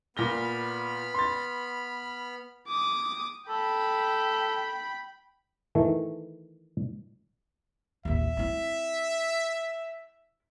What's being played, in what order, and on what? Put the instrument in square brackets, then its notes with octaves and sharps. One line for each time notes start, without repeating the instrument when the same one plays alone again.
[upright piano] A#2 A#6 G7 [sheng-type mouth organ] B3 B5 F6
[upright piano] C6 A6
[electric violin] D6 D#6
[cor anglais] A4 [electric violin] G5 B5
[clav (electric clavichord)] D#3 E3 A3
[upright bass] A1 D#2 [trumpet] E5
[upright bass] C4 E4